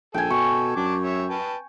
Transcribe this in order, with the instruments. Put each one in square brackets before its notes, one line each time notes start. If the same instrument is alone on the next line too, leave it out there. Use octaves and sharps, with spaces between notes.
[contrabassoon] A#1 [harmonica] A4 [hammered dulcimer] G5 G#5
[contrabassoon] B2 [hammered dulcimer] C#6
[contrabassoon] F#2 [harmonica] A5 D6
[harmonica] C#5 E5
B4 G5 A5